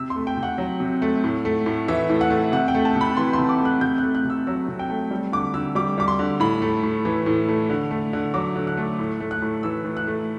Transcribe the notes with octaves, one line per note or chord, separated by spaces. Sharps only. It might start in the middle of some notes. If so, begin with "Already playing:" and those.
Already playing: C3 E6
C6
A3
G5
C3
F#5
F#3
C3
A3
A2
A3
A2
E3 E5
A2
F#5
A3
C3 F#5
G5
A3
A5
C3 B5
E3 C6
C6
C3
D6
A3
F#6
C3 G6
A3 F#6
F#6
C3
E6
F#3 E6
C3
G5
A3
G3
D3 D6
D3 E6
G3 D6
G3 D6
C6
D3
A2 B5
A3
A2
E3
A2
A3
D3
A3
D3
F#3 D6
D3
F#6
A3
A2
A3
F#6
A2
E3 E6
A2
F#6
A3